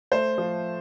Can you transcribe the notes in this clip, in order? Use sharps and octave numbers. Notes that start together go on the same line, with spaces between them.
A3 C5
F3